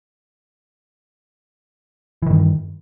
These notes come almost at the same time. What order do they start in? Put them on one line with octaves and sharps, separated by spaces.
E3 D#3 G2